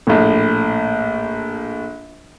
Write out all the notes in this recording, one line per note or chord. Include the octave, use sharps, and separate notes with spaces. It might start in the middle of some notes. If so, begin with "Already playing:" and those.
A#1 A2